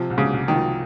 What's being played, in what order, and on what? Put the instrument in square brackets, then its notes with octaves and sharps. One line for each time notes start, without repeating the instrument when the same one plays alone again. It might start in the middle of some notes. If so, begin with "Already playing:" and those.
Already playing: [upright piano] C3 [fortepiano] F3
[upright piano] C2
[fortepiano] C#3
[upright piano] C2
[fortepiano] D#3
[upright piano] F3